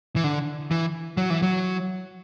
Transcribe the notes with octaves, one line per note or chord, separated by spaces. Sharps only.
E3
D3
E3
F#3
E3
F#3